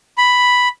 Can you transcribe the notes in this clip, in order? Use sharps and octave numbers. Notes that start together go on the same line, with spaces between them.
B5